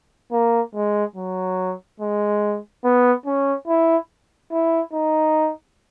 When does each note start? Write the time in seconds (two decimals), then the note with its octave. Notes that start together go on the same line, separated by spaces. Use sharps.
0.32 A#3
0.75 G#3
1.16 F#3
2.00 G#3
2.84 B3
3.26 C#4
3.68 E4
4.52 E4
4.94 D#4